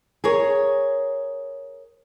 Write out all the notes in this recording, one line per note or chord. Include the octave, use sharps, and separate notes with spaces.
G#4 A#4 C#5